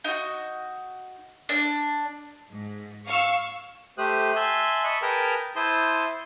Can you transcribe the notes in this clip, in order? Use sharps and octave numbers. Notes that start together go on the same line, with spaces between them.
D#4 F#4
D4
G#2
F5 C#6 E6
A3 G4 C5 D#6 F#6
E5 G#5 A5 C6 F#6
D#5 A5 B5 C#6
G#4 A#4 B4 G5 A5 F6
E4 C5 A5 C6 D#6